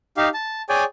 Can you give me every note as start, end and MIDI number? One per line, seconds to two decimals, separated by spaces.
0.17 0.29 63
0.17 0.29 67
0.17 0.29 77
0.34 0.62 81
0.69 0.84 68
0.69 0.84 73
0.69 0.84 74
0.69 0.84 79
0.69 0.84 80